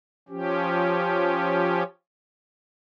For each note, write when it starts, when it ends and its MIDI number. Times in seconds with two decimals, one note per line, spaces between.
0.29 1.83 53
0.29 1.83 61
0.29 1.83 67